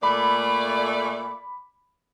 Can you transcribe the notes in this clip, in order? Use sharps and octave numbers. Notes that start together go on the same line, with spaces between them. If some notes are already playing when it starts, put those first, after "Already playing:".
A#2 A3 D5 B5 D6